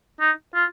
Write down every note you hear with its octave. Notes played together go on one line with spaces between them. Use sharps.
D#4
F4